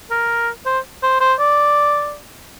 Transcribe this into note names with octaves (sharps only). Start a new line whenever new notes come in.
A#4
C5
C5
C5
D5